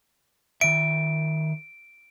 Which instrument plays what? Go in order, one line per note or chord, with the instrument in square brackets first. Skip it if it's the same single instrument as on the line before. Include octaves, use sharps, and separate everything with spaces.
[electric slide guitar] D#3 E5 [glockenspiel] D7